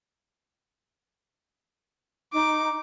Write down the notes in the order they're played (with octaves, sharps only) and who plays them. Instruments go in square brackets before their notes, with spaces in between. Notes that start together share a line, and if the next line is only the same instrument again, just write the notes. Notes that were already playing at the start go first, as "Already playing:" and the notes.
[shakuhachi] D#4 [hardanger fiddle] D6